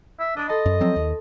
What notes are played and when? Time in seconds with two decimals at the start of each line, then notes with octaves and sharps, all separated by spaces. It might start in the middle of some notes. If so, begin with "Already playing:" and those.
0.19 E5
0.37 D4 D#5 B5 D#6
0.49 A4 D#5 A5 C6
0.66 F#2
0.80 F3 F#3 C4
0.96 D#2